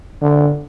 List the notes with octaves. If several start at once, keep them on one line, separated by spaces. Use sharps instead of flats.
D3